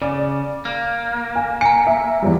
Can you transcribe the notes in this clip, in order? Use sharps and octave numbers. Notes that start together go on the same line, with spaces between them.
C#3 D5
A#3
G#5
G#5 A#5 C#7
E5
E2 F3 G3